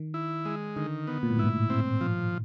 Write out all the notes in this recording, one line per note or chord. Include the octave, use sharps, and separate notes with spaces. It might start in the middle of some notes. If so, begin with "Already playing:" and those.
Already playing: D#3
E4
G#3
D3 D#3
B3
A#2
A2
G#2 E4
A2
C4
F3